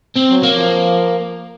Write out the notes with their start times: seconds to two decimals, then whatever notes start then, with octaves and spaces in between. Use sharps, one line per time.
0.16 C4
0.30 F#3
0.43 A#3
0.50 F3